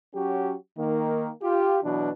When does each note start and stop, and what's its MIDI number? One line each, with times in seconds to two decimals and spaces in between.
0.15 0.55 54
0.15 0.55 61
0.15 0.55 66
0.15 0.55 67
0.78 1.29 51
0.78 1.29 58
1.42 1.80 65
1.42 1.80 67
1.84 2.10 47
1.84 2.10 52
1.84 2.10 54
1.84 2.10 62